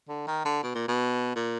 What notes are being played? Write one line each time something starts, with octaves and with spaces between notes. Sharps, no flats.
D3
D#3
D3
B2
A#2
B2
A#2